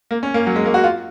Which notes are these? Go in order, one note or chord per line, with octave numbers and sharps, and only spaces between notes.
A#3
C#4
A#3
F#3
G#3
A#3
F#4
F4